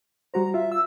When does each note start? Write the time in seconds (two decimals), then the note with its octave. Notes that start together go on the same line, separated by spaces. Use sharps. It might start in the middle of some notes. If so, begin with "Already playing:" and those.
0.34 G3 F#4 C5 A#5
0.54 F4 E5
0.72 E6